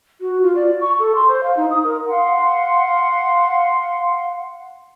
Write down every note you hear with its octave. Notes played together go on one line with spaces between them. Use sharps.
F#4
F4
D5
C#6
A4
C6
C5
F5
D#4
D#6
A#4
F5 F#5 C6